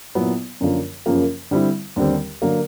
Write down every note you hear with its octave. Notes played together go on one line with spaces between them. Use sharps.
A#2 F#3 B3 E4
F#2 D3 F3 A#3
F#2 C#3 F3 A#3
D3 G3 C4 E4
D#2 D3 G3 C4
D3 F#3 A#3